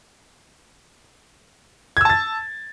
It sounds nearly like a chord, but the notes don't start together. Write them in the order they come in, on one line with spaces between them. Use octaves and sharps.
G#6 E6 A5 A6